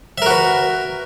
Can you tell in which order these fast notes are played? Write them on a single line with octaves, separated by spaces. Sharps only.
E5 A#4 F#4 B4